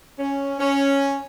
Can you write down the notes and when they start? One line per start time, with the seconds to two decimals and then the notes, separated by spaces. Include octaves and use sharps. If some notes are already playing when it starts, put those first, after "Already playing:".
0.18 C#4
0.59 C#4